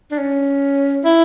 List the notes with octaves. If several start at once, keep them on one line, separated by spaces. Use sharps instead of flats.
D4
C#4
E4